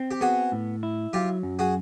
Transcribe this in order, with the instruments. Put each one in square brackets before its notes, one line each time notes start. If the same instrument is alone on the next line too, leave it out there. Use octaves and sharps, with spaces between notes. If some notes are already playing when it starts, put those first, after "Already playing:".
Already playing: [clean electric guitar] C4
[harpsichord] G4
[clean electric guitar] B3 [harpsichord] F#4 G#4
[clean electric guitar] A2
E4
[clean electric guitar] F#3 [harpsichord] F4 G4
[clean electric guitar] F#2
[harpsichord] F#4 G#4